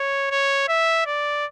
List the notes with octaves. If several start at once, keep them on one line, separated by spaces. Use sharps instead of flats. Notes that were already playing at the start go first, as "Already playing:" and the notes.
Already playing: C#5
C#5
E5
D5